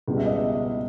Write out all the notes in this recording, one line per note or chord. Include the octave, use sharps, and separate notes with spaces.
C#2 B2 G3
E5
D#5
E5